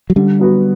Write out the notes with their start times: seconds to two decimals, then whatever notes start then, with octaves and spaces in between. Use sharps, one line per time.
0.10 F#3
0.16 D3 G3
0.39 F#3 B3 F#4